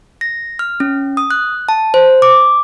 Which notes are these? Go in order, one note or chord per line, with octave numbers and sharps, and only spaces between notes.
A#6
F6
C#4
D#6
F#6
A5
C5
D6